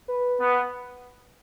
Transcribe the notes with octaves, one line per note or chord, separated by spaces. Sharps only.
B4
B3